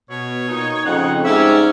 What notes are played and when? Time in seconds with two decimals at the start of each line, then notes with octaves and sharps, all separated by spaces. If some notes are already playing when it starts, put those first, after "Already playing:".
0.10 B2 C#5
0.49 A#2 D#4
0.86 F2 C#3 D#4 F#5
1.25 G#2 G3 C#4 D5 E5